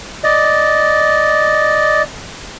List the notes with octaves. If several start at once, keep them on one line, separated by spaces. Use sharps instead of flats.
D5 D#5